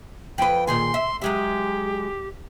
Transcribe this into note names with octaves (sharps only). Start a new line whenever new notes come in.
F2 B4 G5
A#2 D#3 G#4 C6
E5
F#3 G#3 G4 E5